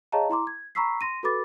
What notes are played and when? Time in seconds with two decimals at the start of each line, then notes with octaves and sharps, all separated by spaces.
0.12 G#4 C#5 D#5 F5 A5 A#5
0.30 E4 A#5 C6 D6
0.47 G#6
0.75 A#5 B5 C#6 E6 B6 C7
1.01 C6 A#6 D#7
1.23 F#4 A4 B4 B5 D6 A6